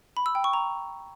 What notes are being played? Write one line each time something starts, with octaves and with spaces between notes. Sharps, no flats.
B5
E6
G5
C#6
A#5